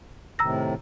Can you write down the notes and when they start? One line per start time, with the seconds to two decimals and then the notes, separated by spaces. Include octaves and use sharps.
0.39 A2 C3 D#3 A#5 E6 A#6